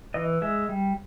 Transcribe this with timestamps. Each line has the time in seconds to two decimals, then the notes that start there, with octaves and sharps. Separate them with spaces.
0.14 E3 D#5
0.42 G#3 E5
0.69 G3